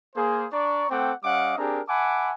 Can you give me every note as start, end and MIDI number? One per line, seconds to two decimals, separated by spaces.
0.16 0.46 58
0.16 0.46 68
0.16 0.46 72
0.53 0.86 62
0.53 0.86 74
0.53 0.86 82
0.53 0.86 85
0.90 1.12 57
0.90 1.12 60
0.90 1.12 69
0.90 1.12 78
0.90 1.12 79
0.90 1.12 86
1.24 1.54 55
1.24 1.54 61
1.24 1.54 75
1.24 1.54 77
1.24 1.54 78
1.24 1.54 86
1.57 1.81 60
1.57 1.81 62
1.57 1.81 67
1.57 1.81 68
1.57 1.81 70
1.88 2.32 76
1.88 2.32 78
1.88 2.32 80
1.88 2.32 81
1.88 2.32 83
1.88 2.32 86